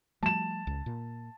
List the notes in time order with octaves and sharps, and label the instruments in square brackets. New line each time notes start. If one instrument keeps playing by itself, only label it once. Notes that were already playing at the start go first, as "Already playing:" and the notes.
[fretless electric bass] F3 G3 A3 [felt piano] A5 E7
[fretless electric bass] C#2
A#2